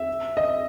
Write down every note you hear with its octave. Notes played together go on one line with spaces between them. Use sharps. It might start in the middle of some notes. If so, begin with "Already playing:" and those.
Already playing: E5
D#5